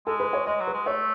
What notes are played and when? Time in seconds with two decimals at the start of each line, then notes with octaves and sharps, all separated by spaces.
0.06 G#3 A4
0.20 B4
0.33 C#5
0.46 G#3 D#5
0.60 F#3
0.67 B4
0.73 G#3
0.86 A3 C#5